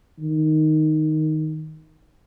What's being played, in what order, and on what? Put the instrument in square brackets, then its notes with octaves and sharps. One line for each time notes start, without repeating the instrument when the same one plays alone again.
[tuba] D#3